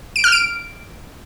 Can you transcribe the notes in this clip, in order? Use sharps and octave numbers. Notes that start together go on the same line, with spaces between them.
D7
F6
D7